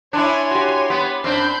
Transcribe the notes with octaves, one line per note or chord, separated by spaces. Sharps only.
D4 E4 C#5 G#5 C6
F#4 G4
B3 G4
F#2 C4 D4 B5 G6 C7